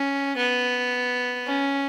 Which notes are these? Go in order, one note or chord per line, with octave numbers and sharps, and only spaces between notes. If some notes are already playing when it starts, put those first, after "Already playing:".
Already playing: C#4
B3
C#4